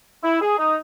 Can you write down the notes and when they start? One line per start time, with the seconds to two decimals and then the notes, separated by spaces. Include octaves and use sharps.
0.24 E4
0.41 G#4
0.58 D#4